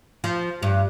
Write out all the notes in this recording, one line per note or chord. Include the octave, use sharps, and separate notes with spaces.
F3
G2